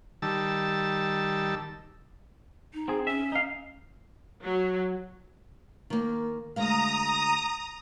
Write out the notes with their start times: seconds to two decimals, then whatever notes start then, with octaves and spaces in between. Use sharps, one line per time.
0.22 D#3 G3 A5 E6
2.74 D#4
2.88 C4 G#4
3.07 C#4 E5
3.32 D#4 F5
4.43 F#3
5.90 D#3 A#3
6.56 D2 G#3 F5 A#5 D#6